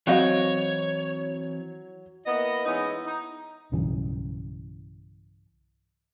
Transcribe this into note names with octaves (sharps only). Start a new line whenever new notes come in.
E3 F#3 C4 B4 C#5 D#5 F5 F#5
A#3 B3 E4 D#5
E3 G#3 B3 C#4 D#4 E4
D#4
B1 G2 C#3 E3